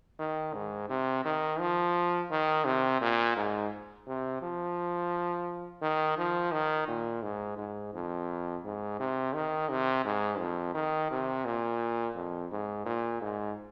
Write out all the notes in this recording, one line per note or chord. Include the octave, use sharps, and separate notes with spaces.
D#3
G#2
C3
D#3
F3
D#3
C3
A#2
G#2
C3
F3
D#3
F3
D#3
A#2
G#2
G#2
F2
G#2
C3
D#3
C3
G#2
F2
D#3
C3
A#2
F2
G#2
A#2
G#2